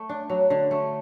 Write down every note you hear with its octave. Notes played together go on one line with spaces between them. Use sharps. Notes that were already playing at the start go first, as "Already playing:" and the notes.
Already playing: A3
D4
F#3
D3
A3